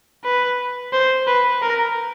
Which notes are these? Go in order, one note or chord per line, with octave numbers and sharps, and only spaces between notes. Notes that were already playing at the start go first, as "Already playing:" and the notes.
B4
C5
B4
A#4